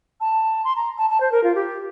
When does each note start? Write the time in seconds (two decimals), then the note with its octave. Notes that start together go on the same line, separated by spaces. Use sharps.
0.21 A5
0.64 C6
0.76 A#5
0.98 A5
1.10 A5
1.20 C5
1.32 A#4
1.44 F4
1.55 G4